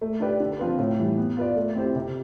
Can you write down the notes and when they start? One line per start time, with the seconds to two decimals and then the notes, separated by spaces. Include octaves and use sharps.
0.01 A3
0.20 D4 G4 B4 D5
0.40 D3
0.59 F3 C4 F4 B4
0.78 A2
0.99 E3 G3
1.17 B3
1.37 F4 B4 D5
1.56 A3
1.75 C4 E4 G4 C5
1.95 C3